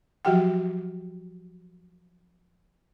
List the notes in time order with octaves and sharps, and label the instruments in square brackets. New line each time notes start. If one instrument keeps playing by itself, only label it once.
[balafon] F3 F#3 F#4 G4 F#5 G5